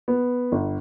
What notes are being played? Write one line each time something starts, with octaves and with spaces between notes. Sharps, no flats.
B3
G1